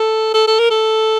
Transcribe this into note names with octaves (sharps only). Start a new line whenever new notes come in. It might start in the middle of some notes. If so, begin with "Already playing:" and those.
Already playing: A4
A4
A4
A#4
A4